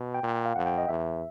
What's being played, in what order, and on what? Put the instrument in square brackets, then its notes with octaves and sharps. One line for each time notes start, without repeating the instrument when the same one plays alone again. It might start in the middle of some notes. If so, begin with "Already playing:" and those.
Already playing: [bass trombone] B2
[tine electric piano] G5
[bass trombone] A#2
[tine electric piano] F5
[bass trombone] F2 [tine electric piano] F#5
[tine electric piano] G5
D#5
[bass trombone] E2 [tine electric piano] E5